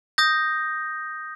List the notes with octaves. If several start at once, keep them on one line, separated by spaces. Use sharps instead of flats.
D#6 G6 A#6